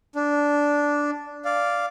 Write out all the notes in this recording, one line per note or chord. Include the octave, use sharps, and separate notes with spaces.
D4
D5 F5